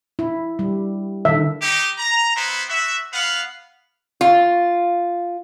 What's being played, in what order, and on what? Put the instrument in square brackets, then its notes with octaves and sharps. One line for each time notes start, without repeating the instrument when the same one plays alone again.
[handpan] E4
G3
[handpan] D3 D#3 [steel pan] E5
[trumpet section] D#4 G4
A#5
B3 E4 C5
F#4 E5
B3 F5 F#5
[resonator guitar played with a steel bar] F4